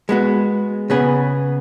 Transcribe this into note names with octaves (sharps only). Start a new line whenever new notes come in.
G#3 B3 F#4
C#3 B3 G#4